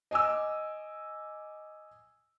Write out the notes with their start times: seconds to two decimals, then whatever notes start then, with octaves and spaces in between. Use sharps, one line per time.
0.11 D#5 G#5 D6 E6